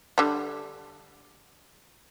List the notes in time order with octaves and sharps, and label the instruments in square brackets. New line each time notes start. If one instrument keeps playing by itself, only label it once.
[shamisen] D3 G3